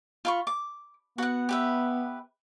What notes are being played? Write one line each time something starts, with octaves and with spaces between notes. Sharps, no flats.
F4 B5 C#6
D6
B3 F#4 F#5
G4 B4 E5